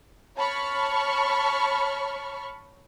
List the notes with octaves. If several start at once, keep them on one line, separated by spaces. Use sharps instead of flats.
C#5 A5 B5 C#6 F6